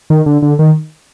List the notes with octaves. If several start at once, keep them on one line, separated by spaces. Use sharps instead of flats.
D#3
D3
D3
D#3